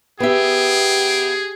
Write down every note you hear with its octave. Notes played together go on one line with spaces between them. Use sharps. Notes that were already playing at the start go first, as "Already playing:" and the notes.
B3 G4 G#4 E5